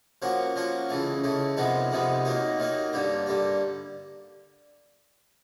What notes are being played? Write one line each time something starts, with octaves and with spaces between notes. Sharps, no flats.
F3 A#3 C#4 F#4
F3 A#3 C#4 F#4
C#2 C#3 E3 A3
C#2 C#3 E3 A3
F2 C3 D#3 G#3 B3
F2 C3 D#3 G#3 B3
D#2 D#3 F#3 A#3 D#4
D#2 D#3 F#3 A#3 D#4
G2 D3 G3 A#3
G2 D3 G3 A#3